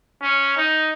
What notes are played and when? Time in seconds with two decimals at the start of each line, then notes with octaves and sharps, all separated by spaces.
0.21 C#4
0.57 D#4